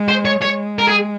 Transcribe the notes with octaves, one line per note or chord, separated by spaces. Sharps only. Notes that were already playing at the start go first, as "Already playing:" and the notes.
Already playing: G#3
C5
C#5
G#3 C#5
A#4
G#4